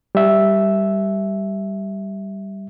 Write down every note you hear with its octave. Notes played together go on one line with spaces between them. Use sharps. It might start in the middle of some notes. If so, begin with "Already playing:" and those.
G3 E5